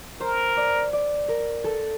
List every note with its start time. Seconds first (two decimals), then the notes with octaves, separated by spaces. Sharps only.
0.21 A#4 C5
0.57 D5
0.93 D5
1.28 A#4
1.64 A4